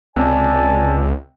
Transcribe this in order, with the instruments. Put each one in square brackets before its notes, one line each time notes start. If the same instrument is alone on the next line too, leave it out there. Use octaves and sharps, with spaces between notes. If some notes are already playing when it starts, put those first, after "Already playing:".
[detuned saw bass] C#2 [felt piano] C3 [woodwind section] D5 G#5 A5